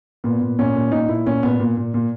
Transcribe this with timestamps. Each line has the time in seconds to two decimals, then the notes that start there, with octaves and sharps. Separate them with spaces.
0.24 A#2 B3
0.41 A#2
0.59 A#2 C#4
0.75 A#2
0.92 A#2 D#4
1.08 A#2 E4
1.26 A#2 C#4
1.43 A#2 B3
1.60 A#2
1.77 A#2
1.94 A#2